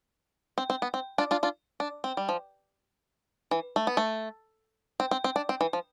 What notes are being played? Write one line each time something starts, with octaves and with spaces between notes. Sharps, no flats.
C4
C4
B3
C4
D4 F4
D4 F4
D4 F4
D4
C4
G3
F3
E3
A3
B3
A3
C4
C4
C4
D4
C4
E3
F3